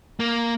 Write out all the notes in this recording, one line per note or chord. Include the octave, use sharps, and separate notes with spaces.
A#3